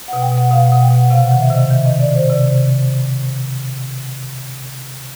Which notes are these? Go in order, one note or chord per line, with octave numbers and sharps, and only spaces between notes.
B2 F#5
G5
B2
F#5
B2 F5
F#5
B2
G5
B2
F#5
C3 F5
D#3 F#5
E5
C3 D#5
D#3 E5
D#3 D#5
D5
D#3
C5
C3 D5
C3